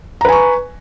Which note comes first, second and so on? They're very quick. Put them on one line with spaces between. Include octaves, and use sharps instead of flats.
A#5 B4 G#5 C#6